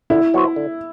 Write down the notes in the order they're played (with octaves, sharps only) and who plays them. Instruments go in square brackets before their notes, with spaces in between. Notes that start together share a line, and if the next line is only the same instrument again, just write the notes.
[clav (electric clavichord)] D3 [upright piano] E4
[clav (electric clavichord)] F#3 B3 F#4 C5
D3